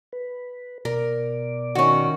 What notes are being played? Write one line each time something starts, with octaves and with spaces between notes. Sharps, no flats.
B4
B2 A#4 D5
D#3 C#4 F#4